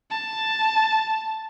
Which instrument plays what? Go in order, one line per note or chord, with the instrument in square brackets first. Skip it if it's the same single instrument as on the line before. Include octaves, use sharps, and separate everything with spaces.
[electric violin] A5